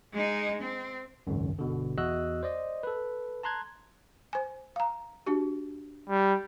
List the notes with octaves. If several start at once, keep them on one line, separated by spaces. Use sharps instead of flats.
G#3 D#4
C4
G#1 C#2 F#2
G1 B2 D3
E2 F#4 D#5 E6 F#6
C5 D5 D#5
A4 B4
A5 A#5 C6 F#6 G#6
C5 G#5
F5 A#5
D4 F#4 G4
G3